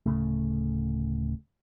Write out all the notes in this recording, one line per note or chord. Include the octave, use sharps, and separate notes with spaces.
D1 C#3 A3